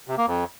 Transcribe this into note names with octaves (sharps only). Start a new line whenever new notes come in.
C3
A#3
F2